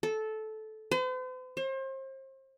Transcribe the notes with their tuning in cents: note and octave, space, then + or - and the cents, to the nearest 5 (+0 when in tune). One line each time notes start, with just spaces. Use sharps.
A4 -15
C5 -45
C5 +35